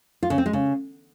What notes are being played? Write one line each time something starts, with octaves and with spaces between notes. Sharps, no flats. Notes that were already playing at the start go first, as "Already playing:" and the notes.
F4
C#3
C4
G#3
C#3